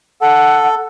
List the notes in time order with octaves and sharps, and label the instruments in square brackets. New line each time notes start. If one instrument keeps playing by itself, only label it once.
[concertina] A4 [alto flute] F#5